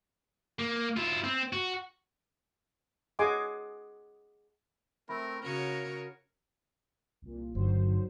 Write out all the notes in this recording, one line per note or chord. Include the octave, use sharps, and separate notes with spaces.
A#3
E4 F4
C4
F#4
G#4 D#5 F#5 G#5 C6 D6
A3 C4 E4 A#4 B5
C#3 F#4 A#4 C#5 A#5
C2 A#2
G1 D#3 F#3 C5